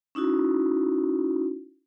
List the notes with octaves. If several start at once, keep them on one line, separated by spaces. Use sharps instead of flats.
C#4 D#4 E4 F#4